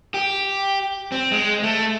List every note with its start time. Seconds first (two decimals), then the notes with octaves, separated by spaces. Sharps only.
0.14 G4
1.12 C4
1.32 G#3
1.63 A3